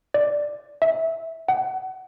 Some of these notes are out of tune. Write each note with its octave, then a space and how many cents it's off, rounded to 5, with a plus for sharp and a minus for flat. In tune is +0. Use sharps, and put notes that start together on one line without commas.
D5 +0
E5 -15
F#5 +25